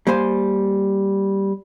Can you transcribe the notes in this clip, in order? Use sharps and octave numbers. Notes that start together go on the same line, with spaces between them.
G3 A#3 C5 G#5 C6